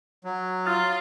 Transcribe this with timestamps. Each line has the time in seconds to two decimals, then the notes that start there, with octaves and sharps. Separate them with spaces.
0.24 F#3
0.66 F4 D#6 F6 A6